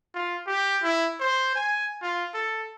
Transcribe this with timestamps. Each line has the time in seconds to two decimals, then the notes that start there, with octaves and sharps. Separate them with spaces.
0.15 F4
0.47 G4
0.83 E4
1.20 C5
1.56 G#5
2.02 F4
2.34 A4